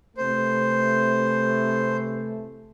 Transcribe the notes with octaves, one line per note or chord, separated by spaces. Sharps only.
C3 E3 A3 C5